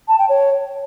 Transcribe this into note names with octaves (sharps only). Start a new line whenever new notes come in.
A5
G5
C#5